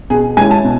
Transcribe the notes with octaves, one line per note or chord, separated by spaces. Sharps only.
B2 G#4
G#3 C#4 E4 G#5
A5
B2